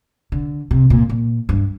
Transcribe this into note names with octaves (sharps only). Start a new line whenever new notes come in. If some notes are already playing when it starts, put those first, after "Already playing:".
D3
C3
A#2
A#2
G2